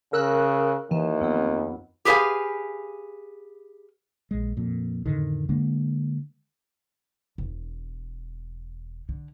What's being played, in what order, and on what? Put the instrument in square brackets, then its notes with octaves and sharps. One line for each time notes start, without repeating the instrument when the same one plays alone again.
[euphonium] C#3 [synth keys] A#4 E6 F#6
[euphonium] D#2 [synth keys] E3
[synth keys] F2 B3
[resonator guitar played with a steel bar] G4 G#4 B4 C5 F5 G#5
[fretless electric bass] A#1 G#3
F2 A#2
F2 A2 D3 D#3
D3 G#3 A#3 D4
[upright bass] E1
D3